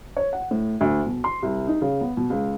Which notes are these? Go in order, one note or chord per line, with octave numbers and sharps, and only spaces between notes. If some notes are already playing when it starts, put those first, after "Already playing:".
C#5
F#5
A2
D2
B2
C6
C2
D#4
C#3
B3
B2
C#2